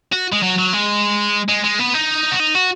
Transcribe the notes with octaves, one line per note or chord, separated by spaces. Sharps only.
F#4
G#3
F#3
F#3
G#3
G#3
G#3
B3
D#4
F#4
D#4
F#4